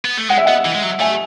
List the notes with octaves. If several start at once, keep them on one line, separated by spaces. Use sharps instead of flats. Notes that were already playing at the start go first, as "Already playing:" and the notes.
B3
A3
G#3 F#5
E5
B3 D#5 F#5
E3
G#3
F#3
A3 E5 G#5